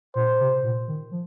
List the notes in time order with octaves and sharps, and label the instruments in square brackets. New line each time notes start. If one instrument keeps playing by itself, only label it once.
[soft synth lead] A#2 [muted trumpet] C5
[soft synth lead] C3
A#2
D#3
F3